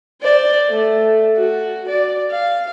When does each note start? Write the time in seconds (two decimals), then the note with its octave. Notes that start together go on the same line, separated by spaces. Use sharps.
0.22 C5 D5
0.69 A3
1.37 F#4
1.88 D5
2.31 F5